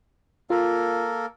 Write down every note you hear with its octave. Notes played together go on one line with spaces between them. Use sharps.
A#3 F4 A4 A#4